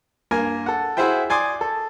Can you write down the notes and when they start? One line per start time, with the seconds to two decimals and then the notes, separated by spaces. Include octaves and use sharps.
0.31 G2 A#3 A#4 G#5
0.66 A4 F#5
0.97 E4 F#4 G#4 C5 E5 G5
1.30 D5 G#5 C6 D6 D#6
1.61 A4